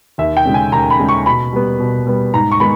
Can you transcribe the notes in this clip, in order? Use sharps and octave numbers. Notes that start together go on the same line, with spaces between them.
D#2 E5
G5
C#3 G#3 C#4
G#5
D#2 A#5
B5
C#3 G#3 C#4
C#6
B2 B5
G3 B3
B2
G3 B3
G#2 A#5
C#6
D#3 G#3 B3 B5